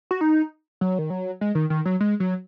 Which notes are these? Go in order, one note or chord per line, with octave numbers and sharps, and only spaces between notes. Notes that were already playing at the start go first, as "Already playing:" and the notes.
F#4
D#4
F#3
D#3
F#3
G#3
D#3
D#3
F#3
G#3
F#3